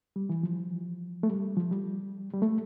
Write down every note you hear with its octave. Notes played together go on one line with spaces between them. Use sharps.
G3
E3
F3
A3
G3
F3
G3
G3
A3